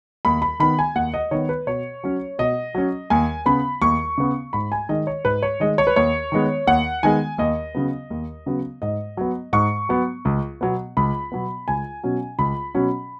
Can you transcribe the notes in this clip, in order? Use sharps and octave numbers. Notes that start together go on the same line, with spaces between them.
D#2 B5
B5
D#3 B3 B5
G#5
D#2 F#5
D#5
D#3 B3 C#5
B4
B2 C#5
F#3 C#4
B2 D#5
F#3 C#4
D#2 G#5
C#3 B3 B5
D#2 C#6
C#3 B3
G#2 B5
G#5
D#3 G#3 D#5
C#5
G#2 B4
C#5
D#3 G#3 D#5
C#5
B4
D#2 C#5
D#3 G#3 B3
D#2 F#5
D#3 G#3 B3 G#5
D#2 D#5
C#3 F#3 B3
D#2
C#3 F#3 B3
G#2 D#5
F#3 B3
G#2 C#6
F#3 B3
C#2
B2 F#3 B3
C#2 B5
B2 F#3 B3
C#2 G#5
B2 F#3 C#4
C#2 B5
B2 F#3 C#4